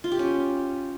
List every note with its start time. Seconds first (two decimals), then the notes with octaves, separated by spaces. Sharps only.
0.04 F4
0.12 G4
0.19 C#4